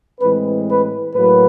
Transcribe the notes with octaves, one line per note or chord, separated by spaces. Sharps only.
A2 E3 G#3 C4 B4
B4
A2 F#3 A#3 B4